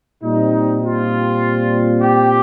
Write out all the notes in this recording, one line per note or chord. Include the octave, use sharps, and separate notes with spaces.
A#2 G3 C4 D#4
F4
G4